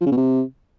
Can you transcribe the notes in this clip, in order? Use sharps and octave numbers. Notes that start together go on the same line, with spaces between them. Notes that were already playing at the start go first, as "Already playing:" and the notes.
F3
C#3
B2
C3